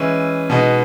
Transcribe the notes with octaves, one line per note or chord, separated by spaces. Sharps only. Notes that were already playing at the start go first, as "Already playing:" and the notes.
Already playing: E3 G#3 C#4 E4
B2 G#3 B3 D#4